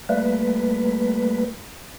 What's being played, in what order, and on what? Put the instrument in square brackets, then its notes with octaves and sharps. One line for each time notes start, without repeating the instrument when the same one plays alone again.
[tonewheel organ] G3 A3 A#3 B4